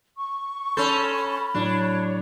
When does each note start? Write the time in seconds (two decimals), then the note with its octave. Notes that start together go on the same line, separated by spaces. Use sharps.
0.17 C#6
0.77 C#4 A4 B5 C6 G6
1.55 A2 F#3 A3 D4 C#5